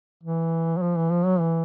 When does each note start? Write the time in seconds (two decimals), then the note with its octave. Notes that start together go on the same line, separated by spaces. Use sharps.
0.23 E3
0.77 F#3
0.83 F3
0.97 E3
1.11 F3
1.26 F#3
1.40 E3